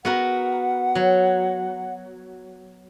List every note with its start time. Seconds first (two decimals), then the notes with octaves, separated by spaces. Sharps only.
0.05 B3 F#4 A#4 F#5
0.95 F#3